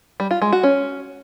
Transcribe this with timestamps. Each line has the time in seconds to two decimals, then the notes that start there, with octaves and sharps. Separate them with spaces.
0.20 G3
0.31 F4
0.42 G#3
0.53 F#4
0.63 C#4